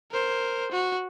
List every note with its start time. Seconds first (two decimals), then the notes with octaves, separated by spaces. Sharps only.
0.11 A#4 C5
0.72 F#4